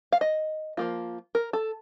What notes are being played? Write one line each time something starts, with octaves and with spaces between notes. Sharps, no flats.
F5
D#5
F3 A#3 F4
A#4
A4